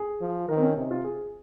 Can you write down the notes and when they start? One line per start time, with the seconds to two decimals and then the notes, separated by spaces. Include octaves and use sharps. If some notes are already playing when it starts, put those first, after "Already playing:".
Already playing: G#4
0.21 F3
0.49 D#3 A#4
0.56 C4
0.63 C#4
0.76 C3 D#4
0.91 F4
1.04 G#4